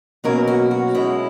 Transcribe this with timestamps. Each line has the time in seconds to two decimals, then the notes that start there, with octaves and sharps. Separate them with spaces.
0.24 B2 F#3 A#3 C#4 A#4
0.48 F#4
0.71 F#4
0.95 B2 G#3 C#4 E4